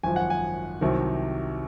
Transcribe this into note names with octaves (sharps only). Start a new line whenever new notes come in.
G#1 F#2 F3 G#5
F#5
G#5
C2 C3 D#3 F#3